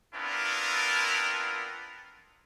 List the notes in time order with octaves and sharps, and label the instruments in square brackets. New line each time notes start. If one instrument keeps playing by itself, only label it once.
[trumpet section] B3 C4 D4 E4 F4 A#4